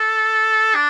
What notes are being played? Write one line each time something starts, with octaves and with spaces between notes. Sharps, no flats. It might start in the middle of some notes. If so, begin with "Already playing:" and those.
Already playing: A4
D4